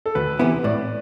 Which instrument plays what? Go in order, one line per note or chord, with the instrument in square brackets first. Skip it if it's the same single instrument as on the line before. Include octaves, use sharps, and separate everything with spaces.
[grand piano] A4
[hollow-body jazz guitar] D2 [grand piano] B4
[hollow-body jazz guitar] C3 E3 B3 E4
[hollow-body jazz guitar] A2 [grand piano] D5